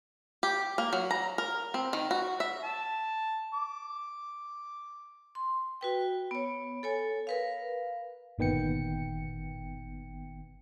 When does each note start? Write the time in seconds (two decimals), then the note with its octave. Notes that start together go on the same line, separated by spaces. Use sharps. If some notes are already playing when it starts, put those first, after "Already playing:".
0.43 G4
0.78 A#3
0.93 F#3
1.11 A#5
1.38 A#4
1.74 C4
1.93 D#3
2.11 F#4
2.40 E5
2.64 A5
3.54 D6
5.35 C6
5.81 F#4 B4 G5
6.31 B3 C#5
6.83 A4 C#5 G#5
7.27 A#4 B4 F5
8.38 G1 A#2 D#3 B3 G5 C#7